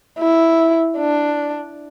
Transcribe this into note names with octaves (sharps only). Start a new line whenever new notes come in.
E4
D4